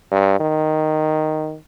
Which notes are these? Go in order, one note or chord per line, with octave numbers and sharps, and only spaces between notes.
G2
D#3